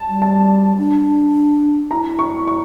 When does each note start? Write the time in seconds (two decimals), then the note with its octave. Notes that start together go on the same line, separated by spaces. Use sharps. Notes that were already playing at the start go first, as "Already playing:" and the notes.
Already playing: A5
0.09 G3
0.22 A5
0.78 D4
1.90 E4 A#5
2.19 C#6
2.48 C#6